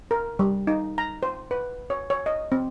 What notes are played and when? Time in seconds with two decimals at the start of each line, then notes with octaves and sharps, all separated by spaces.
0.11 A#4
0.39 G3
0.67 D#4
0.98 A#5
1.23 C5
1.51 B4
1.90 C#5
2.10 C#5
2.26 D#5
2.52 C4